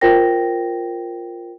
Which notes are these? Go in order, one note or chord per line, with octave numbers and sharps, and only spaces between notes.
F4 A#4 C5 G5 A#6